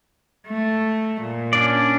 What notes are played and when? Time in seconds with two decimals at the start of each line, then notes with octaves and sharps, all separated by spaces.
0.48 A3
1.22 A#2
1.53 C#4 D4 D5